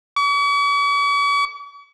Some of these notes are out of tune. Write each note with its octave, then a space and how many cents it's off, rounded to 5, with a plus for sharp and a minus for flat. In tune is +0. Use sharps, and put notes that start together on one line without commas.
C#6 +45